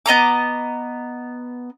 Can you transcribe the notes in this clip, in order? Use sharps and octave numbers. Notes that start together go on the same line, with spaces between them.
B3 D#5 A#5 D6